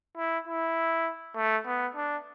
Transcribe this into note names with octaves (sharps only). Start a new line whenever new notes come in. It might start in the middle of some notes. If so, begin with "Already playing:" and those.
E4
E4
A3
B3
D4